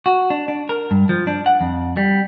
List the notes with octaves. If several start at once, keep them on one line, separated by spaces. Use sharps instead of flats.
F#4
D4
D4
A#4
G2
F3
D4
F#5
F2
G3